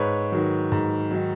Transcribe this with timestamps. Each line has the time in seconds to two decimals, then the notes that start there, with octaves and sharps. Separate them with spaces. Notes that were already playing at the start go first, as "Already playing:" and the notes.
Already playing: G#2 B4 C#5
0.32 D#3 F#3
0.72 G#2
1.11 D#3 F#3